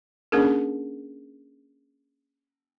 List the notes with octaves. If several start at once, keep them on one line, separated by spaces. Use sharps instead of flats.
A#3 C#4 D4 G#4 A#4